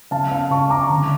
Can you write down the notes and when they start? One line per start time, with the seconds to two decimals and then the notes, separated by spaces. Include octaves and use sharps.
0.11 C#3 F5 A5
0.31 F5 A5
0.50 C#3 A5 C#6
0.70 A#5 D6
0.90 D3